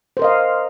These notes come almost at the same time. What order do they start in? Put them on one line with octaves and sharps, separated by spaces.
C5 A#4 D#5 F5